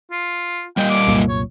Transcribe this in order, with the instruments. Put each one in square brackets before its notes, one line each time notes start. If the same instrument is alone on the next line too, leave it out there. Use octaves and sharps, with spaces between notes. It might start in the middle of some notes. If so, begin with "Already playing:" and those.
[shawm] F4
[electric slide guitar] G3 A#3 D#5 [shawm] G5
[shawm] D6
[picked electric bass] C2 F#2 A#2
[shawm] C#5